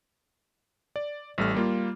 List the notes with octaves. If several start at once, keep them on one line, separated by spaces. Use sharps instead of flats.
D5
A1 G3 A3 F6
G3 A#3 F4